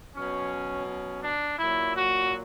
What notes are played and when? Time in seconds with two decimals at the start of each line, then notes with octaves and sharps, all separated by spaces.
0.15 B2 F#3 C#4
0.87 C#4
1.22 D4
1.58 A#2 F#3 E4
1.95 F#4